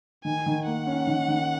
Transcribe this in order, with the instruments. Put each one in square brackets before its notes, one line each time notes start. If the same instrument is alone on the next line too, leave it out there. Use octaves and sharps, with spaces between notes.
[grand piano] D#3 [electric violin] G#5
[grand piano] D#3
[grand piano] A#3 [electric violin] F#5
[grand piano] C#4
D#3
D#3